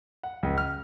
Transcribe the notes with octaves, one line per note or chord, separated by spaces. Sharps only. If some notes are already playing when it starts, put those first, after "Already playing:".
F#5
C#2
F6